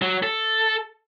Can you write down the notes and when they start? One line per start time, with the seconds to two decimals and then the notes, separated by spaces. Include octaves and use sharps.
0.02 F#3
0.23 A4